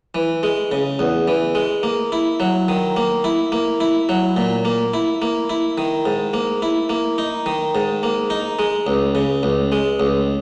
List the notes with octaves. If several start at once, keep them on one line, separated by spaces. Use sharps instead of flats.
E3
G#3
C#3
E2
E3
G#3
A#3
E4
F#3
D#3
A#3
E4
A#3
E4
F#3
A#2
A#3
E4
A#3
E4
D#3
G#2
A#3
E4
A#3
D#4
D#3
G#2
A#3
D#4
G#3
C#2
C#3
C#2
G#3
C#2